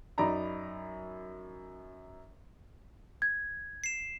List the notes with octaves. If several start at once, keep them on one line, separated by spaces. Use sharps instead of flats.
F#2 D#4 D5 A#5 B5
G#6
C7 E7